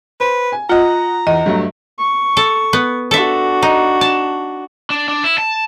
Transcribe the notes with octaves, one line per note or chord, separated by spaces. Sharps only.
B4 C5
G#5
F4 D#5 F#5 A#5
E2 D#5
G2 F#3 A3
C#6
A4
B3
D4 F#4 A4 E5
D#4
A5
D4
D4
E4
A5